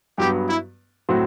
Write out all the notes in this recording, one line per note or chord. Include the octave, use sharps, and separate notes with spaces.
G2 F#3 B3 G4
E4
A2 F#3 C4 F#4